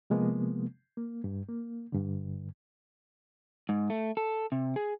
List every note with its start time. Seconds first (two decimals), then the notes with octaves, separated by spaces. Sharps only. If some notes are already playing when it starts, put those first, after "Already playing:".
0.10 C3 F3 G#3 A#3 B3
0.97 A#3
1.24 G2
1.49 A#3
1.92 G2 D3
3.69 G#2
3.90 A3
4.17 A4
4.52 C3
4.76 G#4